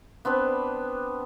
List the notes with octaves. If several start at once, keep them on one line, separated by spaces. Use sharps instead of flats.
B3 C4 D4 B4